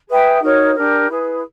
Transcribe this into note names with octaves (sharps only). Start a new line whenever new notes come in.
G#4 B4 E5 G5
D#4 F#4 A#4 C#5
D4 G4 A#4
E4 G#4 B4